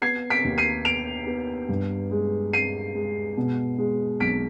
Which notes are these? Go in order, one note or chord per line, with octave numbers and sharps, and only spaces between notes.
B3 G#6 C7
B6 D7
D#2
C7 D#7
B3 D7 F7
B3
G2
G#3
G#3 C7 D#7
G#3
B2
G#3
B1 B6 D7